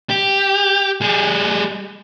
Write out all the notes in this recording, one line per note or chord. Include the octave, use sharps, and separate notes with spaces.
G4
G3 G#4